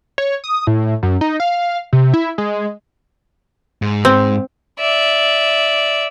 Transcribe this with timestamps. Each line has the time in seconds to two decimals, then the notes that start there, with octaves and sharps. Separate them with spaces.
0.18 C#5
0.44 D#6
0.67 A2
1.03 F#2
1.21 D#4
1.40 F5
1.93 C3
2.14 E4
2.38 G#3
3.82 G#2
4.05 C4
4.79 D5 E5